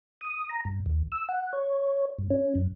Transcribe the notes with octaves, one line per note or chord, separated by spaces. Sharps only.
D#6
A#5
G2
D#2
E6
F#5
C#5
G2
C#4
F#2